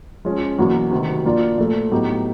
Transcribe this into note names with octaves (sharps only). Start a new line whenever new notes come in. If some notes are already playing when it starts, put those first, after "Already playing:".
F3 G#3 C#4
E2 B2 F#3 A#3
D2 C3 D#3
F3 A#3 D4 F4
A#2 F3 A3
A2 F#3 B3 D#4 G4